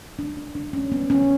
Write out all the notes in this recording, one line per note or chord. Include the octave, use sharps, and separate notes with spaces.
D4
D4
D4
C#4
B3
C#4